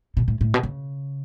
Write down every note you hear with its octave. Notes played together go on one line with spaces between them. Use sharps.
B2
A2
A2
B2
C#3